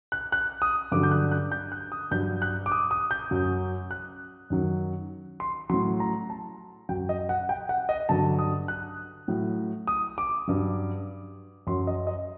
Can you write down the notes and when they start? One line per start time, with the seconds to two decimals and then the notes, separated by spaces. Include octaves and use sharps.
0.12 F#6
0.32 F#6
0.62 D#6
0.92 G2 D3 F#3 D6
1.03 G6
1.11 F#6
1.32 F#6
1.52 G6
1.72 F#6
1.92 D#6
2.11 G2 F#3 G6
2.42 F#6
2.66 D6
2.72 D#6
2.91 D#6
3.11 G6
3.31 F#2 F#3
3.91 F#6
4.50 F#2 D#3 F#3
5.40 C6
5.70 A2 F#3 C6
6.00 A#5
6.30 A5
6.89 F#2 F#3 G5
7.09 D#5
7.29 F#5
7.49 G5
7.69 F#5
7.89 D#5
8.09 G2 D3 F#3 A5
8.39 D#6
8.68 F#6
9.28 A2 F#3
9.87 D#6
10.18 D6
10.48 G2 F#3
11.67 F#2 F#3 C6
11.87 D#5
12.07 D#5